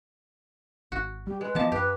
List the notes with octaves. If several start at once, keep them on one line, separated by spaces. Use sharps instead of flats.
G#1 F#4
G3 G4
G#3 B4
E3 F3 B3 G4 D#5 A5
F#2 G4 B4